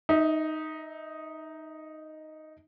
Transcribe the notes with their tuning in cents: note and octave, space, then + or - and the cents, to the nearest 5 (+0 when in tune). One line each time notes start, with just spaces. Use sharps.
D#4 +0 E5 -30